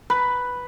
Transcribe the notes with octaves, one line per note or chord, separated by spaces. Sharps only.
B4